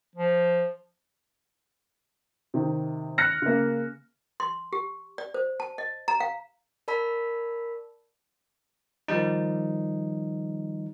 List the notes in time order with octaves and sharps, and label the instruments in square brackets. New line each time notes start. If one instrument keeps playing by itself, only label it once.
[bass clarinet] F3
[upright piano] C3 D#3
F6 F#6 A#6 C#7
C#3 A#3
[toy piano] C6
G4
D5
C5
A5
D#5
A#5
F5
[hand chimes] A#4 D5 A5 B5 E6 B6
[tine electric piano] D#3 F3 G3 D#4